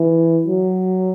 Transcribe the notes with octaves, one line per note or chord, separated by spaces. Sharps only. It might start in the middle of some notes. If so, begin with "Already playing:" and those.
Already playing: E3
F#3